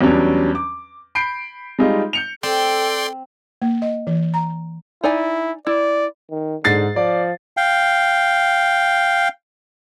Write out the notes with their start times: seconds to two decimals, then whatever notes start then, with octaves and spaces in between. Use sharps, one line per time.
0.01 E2 F#3 G3 C#4 D4
0.55 D6
1.15 B5 G6 C7 D7
1.79 G3 G#3 D#4 F4
2.13 G6 C#7 F7
2.43 C4 A4 D5 G5 C6
3.62 A#3
3.82 D#5
4.07 E3
4.34 A#5
5.04 D#4 E4 D5 G#5
5.67 E4 D5
6.30 D#3
6.64 G#2 D3 A6 C7
6.96 F3 D5
7.57 F5 G5